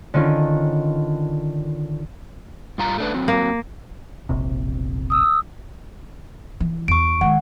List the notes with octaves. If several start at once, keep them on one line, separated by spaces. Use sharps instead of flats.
D3 D#3 C#4 F4
G2 F4 A#5
A3 D4 B4
F#3 C4
A#3
E1 A#1 C3
D#6 E6
E3
E2 C#6 D7
D#3 G#3 F#5